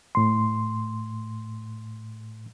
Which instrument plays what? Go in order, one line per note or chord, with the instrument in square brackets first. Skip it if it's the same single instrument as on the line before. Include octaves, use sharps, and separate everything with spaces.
[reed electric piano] A2 C6